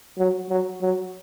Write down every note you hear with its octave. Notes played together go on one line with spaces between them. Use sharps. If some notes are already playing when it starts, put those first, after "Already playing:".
F#3
F#3
F#3